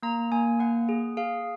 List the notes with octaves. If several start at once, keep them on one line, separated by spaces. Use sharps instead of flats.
A#3 A#5
A#3 G#5
A#3 F#5
G#4
G#4 F5